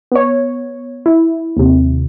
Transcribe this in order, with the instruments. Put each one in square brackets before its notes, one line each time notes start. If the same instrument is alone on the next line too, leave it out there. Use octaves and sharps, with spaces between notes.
[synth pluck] B3 C#5
E4
D#2 C3